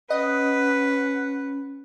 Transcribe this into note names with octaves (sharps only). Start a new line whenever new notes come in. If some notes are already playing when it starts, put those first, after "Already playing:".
C#4 B4 D#5 F#5